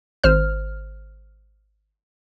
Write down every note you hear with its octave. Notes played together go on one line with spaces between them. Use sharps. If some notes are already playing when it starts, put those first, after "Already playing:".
G#1 C5 F6